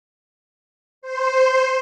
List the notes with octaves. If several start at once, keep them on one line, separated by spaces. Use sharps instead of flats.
C5